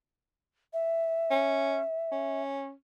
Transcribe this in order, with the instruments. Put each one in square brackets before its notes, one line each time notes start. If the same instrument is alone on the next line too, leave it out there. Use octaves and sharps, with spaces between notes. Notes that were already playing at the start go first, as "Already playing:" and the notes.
[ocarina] E5
[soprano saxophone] C#4
C#4